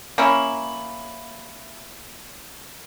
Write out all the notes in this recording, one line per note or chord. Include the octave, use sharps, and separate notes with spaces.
A#3 C#4 E4